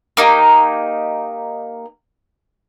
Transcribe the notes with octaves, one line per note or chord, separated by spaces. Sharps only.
A#3 D#4 G4